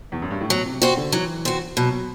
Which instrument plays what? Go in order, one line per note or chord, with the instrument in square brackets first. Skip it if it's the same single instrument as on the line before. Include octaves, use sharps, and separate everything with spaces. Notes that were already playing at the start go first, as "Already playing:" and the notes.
[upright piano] E2
F#2
G2
A2
[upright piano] B2 [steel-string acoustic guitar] F#3
[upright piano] C3
[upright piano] C3 [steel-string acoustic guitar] C4 F#4
[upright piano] D3
[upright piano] E3 [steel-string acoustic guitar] F#3
[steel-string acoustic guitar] C4 F#4
[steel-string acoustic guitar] B2 [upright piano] F#3